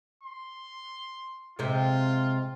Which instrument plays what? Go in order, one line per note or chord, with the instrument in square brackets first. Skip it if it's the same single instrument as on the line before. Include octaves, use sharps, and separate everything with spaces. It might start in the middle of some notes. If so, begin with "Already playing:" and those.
[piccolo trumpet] C6
[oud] C3 G#3 [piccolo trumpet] F4